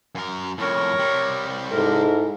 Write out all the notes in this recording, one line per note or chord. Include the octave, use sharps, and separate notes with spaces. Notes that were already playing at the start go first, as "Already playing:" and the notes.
F#2 A#4
F2 A2 A#4 C#5
C3 G3
G#2 E4 A4 A#4